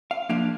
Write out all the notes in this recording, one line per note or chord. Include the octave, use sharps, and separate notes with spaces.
F5
F3 A#3 D4 F5